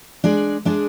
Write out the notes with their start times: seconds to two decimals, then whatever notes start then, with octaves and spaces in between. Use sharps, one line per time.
0.24 G#3 D4 G#4 D5
0.65 G#3 D4 G#4 D5